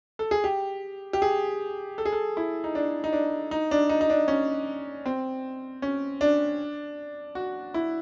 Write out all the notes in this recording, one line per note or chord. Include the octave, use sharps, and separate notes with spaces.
A4
G#4
G4
G4
G#4
A4
G#4
A4
E4
D#4
D4
D#4
D4
D#4
D4
D#4
D#4
D4
C#4
C4
C#4
D4
F#4
E4